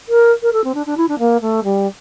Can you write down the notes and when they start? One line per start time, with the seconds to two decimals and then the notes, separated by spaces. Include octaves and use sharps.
0.09 A#4
0.43 A#4
0.53 A4
0.64 C4
0.75 D4
0.86 D4
0.97 E4
1.09 D4
1.19 A#3
1.41 A3
1.64 G3